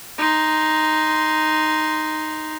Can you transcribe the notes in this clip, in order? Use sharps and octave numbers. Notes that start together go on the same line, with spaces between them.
D#4 C6